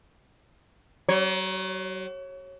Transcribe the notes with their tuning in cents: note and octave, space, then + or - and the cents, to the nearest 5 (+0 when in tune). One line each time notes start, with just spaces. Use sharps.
F#3 +40 C#5 -20